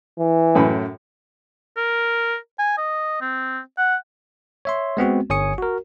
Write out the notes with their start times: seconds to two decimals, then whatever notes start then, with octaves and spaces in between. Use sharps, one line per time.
0.18 E3
0.55 F#2 A2 B5
1.77 A#4
2.59 G#5
2.78 D#5
3.21 C4
3.78 F#5
4.65 C#5 E5 C6
4.97 G#3 B3 C4 F#4
5.30 G1 C#5 G#5 D#6 C#7
5.58 F#4 A#4